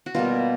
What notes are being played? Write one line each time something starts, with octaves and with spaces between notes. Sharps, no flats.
F#4
B2 G3 A#3 F4